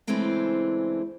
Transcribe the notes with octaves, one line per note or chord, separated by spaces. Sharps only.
C#3 E3 G#3 A3 C4 D4